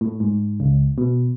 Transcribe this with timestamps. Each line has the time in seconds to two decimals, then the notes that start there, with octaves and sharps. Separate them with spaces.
0.01 A2
0.20 G#2
0.60 C#2
0.98 B2